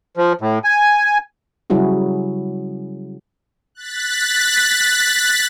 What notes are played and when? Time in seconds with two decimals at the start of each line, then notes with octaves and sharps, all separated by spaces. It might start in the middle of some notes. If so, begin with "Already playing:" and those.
0.17 F3
0.41 A2
0.64 G#5
1.70 C#3 F#3 G3 E4 F#4 G#4
3.75 F#6 A6 B6